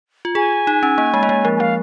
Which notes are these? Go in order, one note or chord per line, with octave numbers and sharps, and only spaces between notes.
F4
G#4 G#5
D#4
C#4
A#3
G#3
A#3
G#3
F3
G#5
F3 F5